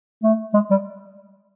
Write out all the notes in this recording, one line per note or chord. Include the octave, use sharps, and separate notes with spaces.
A3
G#3
G3